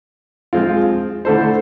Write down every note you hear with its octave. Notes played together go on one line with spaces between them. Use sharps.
F3 G#3 C4 F4
D3 A3 E4 A4 C5